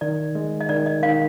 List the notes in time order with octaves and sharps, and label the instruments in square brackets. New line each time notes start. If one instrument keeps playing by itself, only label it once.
[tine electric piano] D#3 [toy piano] D5
[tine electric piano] G#3
[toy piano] D#5
[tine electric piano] D#3 [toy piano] D5
[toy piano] D#5
[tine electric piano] D#3 [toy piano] F5